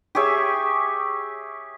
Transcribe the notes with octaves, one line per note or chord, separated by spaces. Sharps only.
G4 G#4 C#5 E5